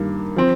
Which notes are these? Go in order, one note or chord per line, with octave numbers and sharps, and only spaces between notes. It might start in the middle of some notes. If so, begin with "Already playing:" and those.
Already playing: G2 D#3 A#3
F3 C4